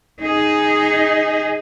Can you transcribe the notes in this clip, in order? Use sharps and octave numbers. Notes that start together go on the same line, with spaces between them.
D#4 G#4